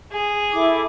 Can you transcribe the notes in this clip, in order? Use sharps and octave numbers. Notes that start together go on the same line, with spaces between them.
G#4
E4 A4 D6